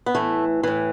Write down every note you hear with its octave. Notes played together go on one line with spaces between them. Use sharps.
B3
A2 E3 A3
A2 E3